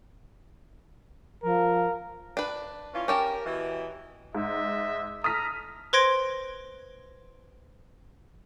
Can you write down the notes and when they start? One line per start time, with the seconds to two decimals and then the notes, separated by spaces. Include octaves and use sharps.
1.43 F3 A#4
2.37 D4 B4
2.93 E3 C#4 F4
3.08 C#4 G4 A#4 A5
3.45 B2 E3
4.35 G#2 D#5 E5
5.24 A4 A#5 D#6 F6 B6
5.93 B4 C5 C6 G#6 A#6 D7